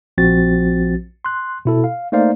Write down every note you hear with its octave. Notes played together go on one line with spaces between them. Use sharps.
A#1 F3 C4 F#4 A6
C6 F#6
B2 E4 A4
F5
A3 A#3 D#4 C5 D5 F5